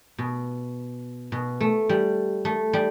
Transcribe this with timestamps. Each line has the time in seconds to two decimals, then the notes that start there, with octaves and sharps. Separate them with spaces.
0.18 B2
1.32 B2
1.61 A3
1.89 G3
2.45 A3
2.73 G3